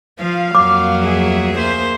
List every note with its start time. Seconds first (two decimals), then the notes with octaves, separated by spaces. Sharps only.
0.20 F3 F5
0.55 F2 F#3 A#3 D6
1.02 D2 G#4 E5
1.58 A#3 C5